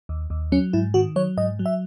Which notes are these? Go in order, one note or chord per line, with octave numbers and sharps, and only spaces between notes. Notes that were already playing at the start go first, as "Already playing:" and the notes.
D#2
D#2
F#3 C#4
G#2 E4
D#3 F#4
F#3 C#5
G#2 D#5
F#3
E5